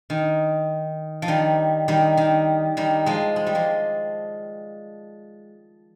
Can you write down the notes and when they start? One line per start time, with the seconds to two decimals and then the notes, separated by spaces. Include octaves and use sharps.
0.10 D#3
1.22 F3
1.28 D#3 G3
1.88 D#3 G3
2.17 D#3
2.77 D#3 G3
3.06 F3 G#3
3.36 G#3
3.46 G3
3.55 F3 G#3